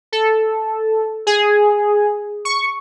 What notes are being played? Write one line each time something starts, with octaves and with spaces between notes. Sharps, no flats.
A4
G#4
C#6